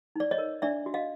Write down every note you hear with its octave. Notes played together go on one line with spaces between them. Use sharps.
D#4 D5
C#5 D#5
A#4
D4 D5 E5
F#4
D#5 F5